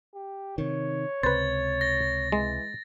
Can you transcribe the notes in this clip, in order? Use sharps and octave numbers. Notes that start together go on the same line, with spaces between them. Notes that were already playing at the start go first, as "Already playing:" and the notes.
G4
C3 D#3 C#5
C#2 C3 B4 C5 A6
A#6
E3 G#3